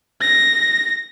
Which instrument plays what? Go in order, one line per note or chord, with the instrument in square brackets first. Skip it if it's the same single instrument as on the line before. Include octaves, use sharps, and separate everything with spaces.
[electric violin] A#6